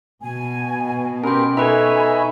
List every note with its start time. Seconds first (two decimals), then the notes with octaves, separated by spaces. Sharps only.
0.22 B2 G#5
1.24 C#4 G4 A#4 G5 B5 C6
1.57 D#4 A4 B4 E5 G#5 A#5 B5 C#6